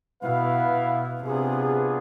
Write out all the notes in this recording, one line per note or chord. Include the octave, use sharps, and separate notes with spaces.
B2 B3 E4 B4 F5
B2
C3 B3 D4 F4 G#4